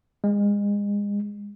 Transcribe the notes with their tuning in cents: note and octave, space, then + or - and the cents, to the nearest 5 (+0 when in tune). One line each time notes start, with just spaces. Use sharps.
G#3 -30